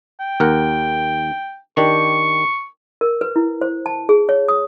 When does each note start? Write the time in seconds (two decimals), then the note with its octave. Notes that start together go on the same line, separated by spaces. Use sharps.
0.20 G5
0.40 D#2 A#4 F#5
1.77 D#3 D4 G4 C#6
3.01 A#4
3.21 B4
3.36 E4
3.61 C5
3.86 A5
4.09 G#4
4.29 C#5
4.48 D#6